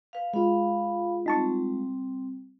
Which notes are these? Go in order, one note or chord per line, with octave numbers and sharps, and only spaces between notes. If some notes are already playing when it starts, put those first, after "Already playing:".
B4 F5
G#3 F4 F5 B5
G3 C4 D#4 A5 C#6